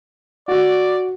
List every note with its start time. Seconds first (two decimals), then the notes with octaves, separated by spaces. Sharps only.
0.48 F#4 D5